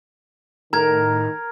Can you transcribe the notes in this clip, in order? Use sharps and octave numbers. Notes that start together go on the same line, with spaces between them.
A2 D#3 A#4 A#5 G#6